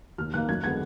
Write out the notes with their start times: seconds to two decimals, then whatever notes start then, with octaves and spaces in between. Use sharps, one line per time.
0.18 D#2 F6
0.34 D#3 A#3 F#6
0.48 F#2 G#6
0.64 D3 G#3 B3 G#6